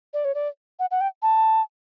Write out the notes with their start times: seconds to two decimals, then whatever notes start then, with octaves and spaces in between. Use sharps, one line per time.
0.14 D5
0.25 C#5
0.34 D5
0.79 F#5
0.91 F#5
1.01 G5
1.22 A5